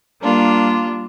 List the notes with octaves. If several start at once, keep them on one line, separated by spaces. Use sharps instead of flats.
G3 A#3 D4 F4